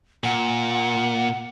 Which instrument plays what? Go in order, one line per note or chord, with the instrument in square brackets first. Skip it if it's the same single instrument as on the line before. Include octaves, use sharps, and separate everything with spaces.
[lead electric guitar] A#2 [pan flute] F#5